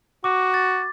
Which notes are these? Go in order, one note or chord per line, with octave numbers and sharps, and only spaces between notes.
F#4 D6
A6